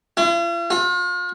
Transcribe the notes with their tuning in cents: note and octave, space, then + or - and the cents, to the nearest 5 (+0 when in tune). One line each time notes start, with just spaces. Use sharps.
F4 -45
F4 +40